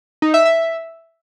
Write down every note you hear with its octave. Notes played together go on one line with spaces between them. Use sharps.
D#4
E5
E5